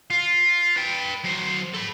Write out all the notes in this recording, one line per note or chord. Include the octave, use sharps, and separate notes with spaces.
F4
B4 G5
F#3 C5
A4 B5